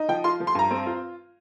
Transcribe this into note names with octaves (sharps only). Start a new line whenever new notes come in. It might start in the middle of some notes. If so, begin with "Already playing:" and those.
Already playing: D#4
F3 G5
F4 C6
F3
C6
G2 A#5
C4
F4